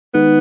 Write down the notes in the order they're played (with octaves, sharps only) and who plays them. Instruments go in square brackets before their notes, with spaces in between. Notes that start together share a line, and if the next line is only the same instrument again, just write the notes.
[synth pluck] D#3 G#3 D#4 [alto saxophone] B3